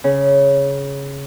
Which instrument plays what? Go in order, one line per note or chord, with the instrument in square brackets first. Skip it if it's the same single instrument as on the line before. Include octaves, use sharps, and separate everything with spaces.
[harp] C#3